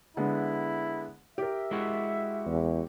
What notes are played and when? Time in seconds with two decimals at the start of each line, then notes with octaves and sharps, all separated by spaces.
0.17 D3 G#3 B3 E4
1.38 G4 A#4 E5
1.71 G#3 E4 F#4
2.47 E2